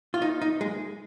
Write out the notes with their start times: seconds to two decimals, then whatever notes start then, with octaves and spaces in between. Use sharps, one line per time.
0.14 F4
0.22 D#4
0.42 D#4
0.61 G#3